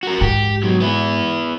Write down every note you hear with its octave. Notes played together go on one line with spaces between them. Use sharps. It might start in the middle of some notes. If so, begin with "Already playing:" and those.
F#4 A#4
G#2 G4
B2 F#3
B3 E4